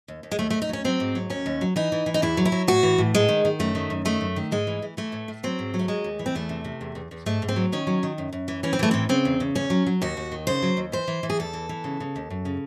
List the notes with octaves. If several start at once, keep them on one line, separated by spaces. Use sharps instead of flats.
D#2
D#2
G#3
D#2 A3
D#2 A3
D#4
F#3 C#4
F#3 C4
G#2
F#3
D#2 C#4
D#2
F#3
E3 D#4
E3
E3
D#4
E2 E4
F#3
E4
F#3
A2 F#4
E3
A2
G#2 G#3
D#3
D#3
F#2 A3
D#3
F#2
D#3 A3
F#2
D#3
G#2 G#3
E3
E3
E3 A3
A2
A2
F#3 C4
G#2
F#3
A3
D#2 G#3
D#2
E3
C4
E2 A3
C3
C3
E2
E2
E2
G#2 A3
G#2
C4
F#3
D#3 C#4
F#3
D#3
F#2
F#2
E3
E3 C#4
C4
E3 A3
A2 C4
C#3 C4
E2
C#3
E2 C#4
F#3
F#3
D#2 F#4
D#2
D#3
C#3 C5
F#3
D#2
E3 C5
E3
E3
G#4
E2 A4
E3
E3
C#3
C#3
D#2
F#2
C#3